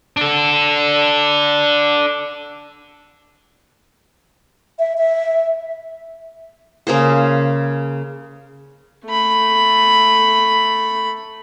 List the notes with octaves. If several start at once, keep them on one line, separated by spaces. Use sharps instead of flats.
D4 A4
E5
E5
C#3 A#3 G#4 C5
A3 B5